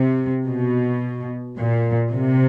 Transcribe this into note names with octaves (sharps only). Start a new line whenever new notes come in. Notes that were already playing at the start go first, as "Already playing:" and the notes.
Already playing: C3
B2
A#2
C3